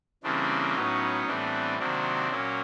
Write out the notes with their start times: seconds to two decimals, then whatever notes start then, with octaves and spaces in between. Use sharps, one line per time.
0.23 C#3 E3 G3 A#3 C4 D4
0.75 A2 F#3 B3 C#4 D#4
1.26 A2 E3 G3 B3 C4 D4
1.79 C3 D#3 F#3 A#3 C4 D4
2.31 A#2 F#3 A#3 C#4